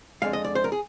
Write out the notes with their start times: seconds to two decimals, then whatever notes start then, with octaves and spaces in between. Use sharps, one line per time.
0.22 F2 D3 G#3 F5
0.33 D#5
0.44 D5
0.55 C5
0.64 A#4
0.72 G#4